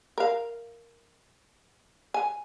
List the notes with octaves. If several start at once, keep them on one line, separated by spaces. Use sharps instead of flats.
A#4 F5
G#5